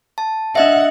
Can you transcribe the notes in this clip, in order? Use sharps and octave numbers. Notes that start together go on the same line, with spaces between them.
A5
D4 D#5 E5 F#5